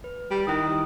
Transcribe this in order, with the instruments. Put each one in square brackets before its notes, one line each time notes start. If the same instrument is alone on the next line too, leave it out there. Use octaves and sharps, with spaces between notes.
[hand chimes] B4
[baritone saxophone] G3
[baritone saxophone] D#3 [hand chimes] E4 D#6